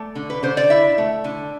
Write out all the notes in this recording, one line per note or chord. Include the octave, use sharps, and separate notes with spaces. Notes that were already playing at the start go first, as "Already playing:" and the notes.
Already playing: A3 D5
D3
B4
D3 C5
D5
E4 E5
A3
D3